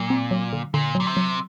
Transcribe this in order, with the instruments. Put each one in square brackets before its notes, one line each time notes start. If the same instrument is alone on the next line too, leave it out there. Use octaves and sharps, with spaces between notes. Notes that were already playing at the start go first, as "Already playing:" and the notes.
Already playing: [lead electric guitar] A#2 [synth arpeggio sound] F#3
[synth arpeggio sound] C4
F#3
D3
[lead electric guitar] A#2 [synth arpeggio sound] D3
[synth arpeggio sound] F#3
[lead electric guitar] A#2
C3
[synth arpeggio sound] F#3